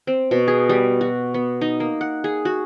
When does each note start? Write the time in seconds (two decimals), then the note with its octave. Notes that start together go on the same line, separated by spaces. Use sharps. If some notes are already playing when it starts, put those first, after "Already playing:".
0.07 C4
0.31 B2
0.48 G#4
0.69 G3
1.01 F#4
1.34 B3
1.61 D#4
1.80 A#3
2.01 F#5
2.24 G#4
2.45 F#4